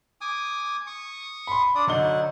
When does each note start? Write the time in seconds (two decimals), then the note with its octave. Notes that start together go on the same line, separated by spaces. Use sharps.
0.21 G#5 D6 D#6
0.87 C#6 D#6
1.47 B5 C6
1.75 D4 D5 D#6
1.87 D3 F#3 D#4 F#5 G7